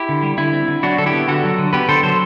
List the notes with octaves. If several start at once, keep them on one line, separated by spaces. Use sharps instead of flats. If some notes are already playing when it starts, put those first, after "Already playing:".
Already playing: E4 G4
D3
G3
D3 E4
C4
D3
F#3 D4 F#4
D3 A4
E4 G4
B3
D3 F#4 A4
F#3
D3
B3 G4 B4
D3 A4 C5
F#3 A4 C5